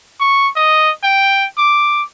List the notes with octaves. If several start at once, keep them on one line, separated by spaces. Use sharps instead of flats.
C#6
D#5
G5
D6